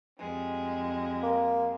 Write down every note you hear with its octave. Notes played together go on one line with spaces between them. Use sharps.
F2 G3 G#3
A#3